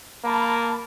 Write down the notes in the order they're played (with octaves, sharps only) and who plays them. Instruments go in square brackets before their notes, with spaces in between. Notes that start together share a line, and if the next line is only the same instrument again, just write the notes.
[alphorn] A#3 [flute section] A5 B5